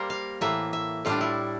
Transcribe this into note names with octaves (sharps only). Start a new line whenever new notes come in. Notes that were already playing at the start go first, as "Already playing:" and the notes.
Already playing: G3 A#3 A#4 C5
F5
A2 E3 A#3 E5
E5
A2 G3 D4 F4
E4